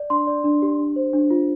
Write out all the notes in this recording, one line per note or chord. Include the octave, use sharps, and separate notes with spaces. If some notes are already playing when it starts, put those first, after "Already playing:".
Already playing: D5
D4 C6
D5
D4
G4
D4
C5
D4
F4